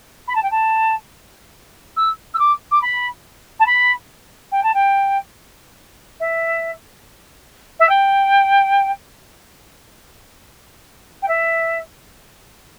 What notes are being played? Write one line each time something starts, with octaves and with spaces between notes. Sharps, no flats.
B5
A5
G5
A5
E6
E6
D6
D6
B5
A5
B5
G5
A5
G5
E5
E5
G5
G5
E5